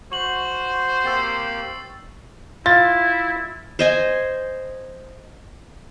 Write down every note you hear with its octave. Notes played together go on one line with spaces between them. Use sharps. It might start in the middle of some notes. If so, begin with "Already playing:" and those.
F#4 C5 C#6 F#7
A#3 C4 G4 E6 A6 C7
E4 F4 A6
C5 D#5 G#5